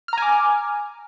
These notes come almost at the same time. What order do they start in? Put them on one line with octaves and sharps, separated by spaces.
F6 A#5 G#5 D6